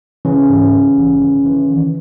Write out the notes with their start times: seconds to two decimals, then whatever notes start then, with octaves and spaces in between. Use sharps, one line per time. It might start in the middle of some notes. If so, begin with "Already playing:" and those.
0.25 C#3 E3 C#4
0.49 G#2
0.74 E3
0.98 A#1
1.22 E3
1.46 E3
1.70 D#3